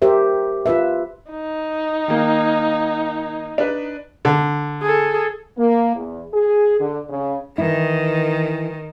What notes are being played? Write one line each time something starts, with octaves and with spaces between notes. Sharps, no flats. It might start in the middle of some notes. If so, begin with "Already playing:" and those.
G4 A#4 C5 E5
F4 B4 E5
D#4
D#3 A#3
D4 B4
D3
G#4 A4
A#3
E2
G#4
D3
C#3
D#3 E3 E4